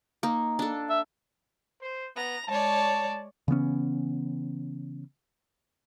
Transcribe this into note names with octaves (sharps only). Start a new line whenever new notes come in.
A#3 D#4
D4 A4
E5
C5
B3 A#5
G#3 C#5 D5 A5
C#3 E3 B3 C#4